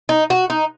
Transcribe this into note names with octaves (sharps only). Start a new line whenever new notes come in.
D#4
F#4
D#4